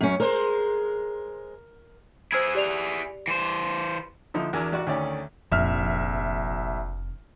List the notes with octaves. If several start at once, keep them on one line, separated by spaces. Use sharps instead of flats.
F#2 C#4
G#3 A#4 C5
E4 G#4 C5 E6 G#6
G4 D5 F7
E3 C5
D3 F3 D#4 E4
E2 D4 F#4 A#4 G#5 E6
A1 F#4 D5 C#6 F#6
D2 D#3 A3 C#4 D5
F1 A#1 E5 F6